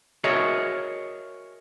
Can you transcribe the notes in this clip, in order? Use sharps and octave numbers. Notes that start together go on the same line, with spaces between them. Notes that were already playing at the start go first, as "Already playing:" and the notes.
F#4 G#4 A#4 C#5 D#5 E5